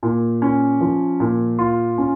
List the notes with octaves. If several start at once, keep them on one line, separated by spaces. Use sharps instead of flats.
A#2
C#4
F3
A#2
F4
C#4